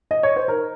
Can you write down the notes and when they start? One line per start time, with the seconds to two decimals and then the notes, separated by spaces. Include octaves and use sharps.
0.11 D#5
0.23 C#5
0.36 C5
0.48 D#4 A#4